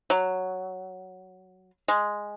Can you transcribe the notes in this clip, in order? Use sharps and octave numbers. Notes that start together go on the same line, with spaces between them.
F#3
G#3